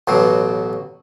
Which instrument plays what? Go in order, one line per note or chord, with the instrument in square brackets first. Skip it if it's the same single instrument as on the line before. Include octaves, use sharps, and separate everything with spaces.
[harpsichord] A1 B2 F#3